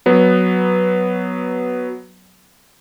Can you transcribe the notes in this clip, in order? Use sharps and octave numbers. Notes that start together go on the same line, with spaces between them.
F#3 B3